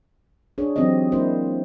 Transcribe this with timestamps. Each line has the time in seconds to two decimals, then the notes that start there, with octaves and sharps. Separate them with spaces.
0.58 D4 G#4 C#5
0.76 E3 F#3 C4 D#4 G4 D#5
1.12 A#3 D4 E4 C5